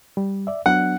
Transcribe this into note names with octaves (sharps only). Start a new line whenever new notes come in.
G3
D5 E5
F#3 B3 D4 F#5